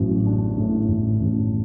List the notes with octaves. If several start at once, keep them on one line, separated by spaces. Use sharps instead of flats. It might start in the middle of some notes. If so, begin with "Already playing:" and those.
Already playing: A1 F#3
D4
A2
A1
A1